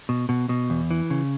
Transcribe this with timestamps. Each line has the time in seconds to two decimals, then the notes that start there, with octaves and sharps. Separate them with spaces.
0.09 B2
0.29 B2
0.49 B2
0.70 E2
0.91 E3
1.10 C#3